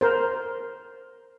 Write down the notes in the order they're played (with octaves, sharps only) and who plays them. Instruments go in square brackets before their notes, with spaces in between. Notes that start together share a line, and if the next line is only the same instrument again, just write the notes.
[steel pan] A#4 C5